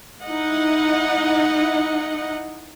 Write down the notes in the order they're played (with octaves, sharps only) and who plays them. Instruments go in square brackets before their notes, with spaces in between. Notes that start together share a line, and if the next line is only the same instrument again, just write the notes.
[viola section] D#4 E4 D#5 F#5